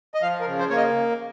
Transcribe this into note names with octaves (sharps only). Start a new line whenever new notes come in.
D#5
F3 F5
A#4
C#3
C5
A#3 C#5
D#5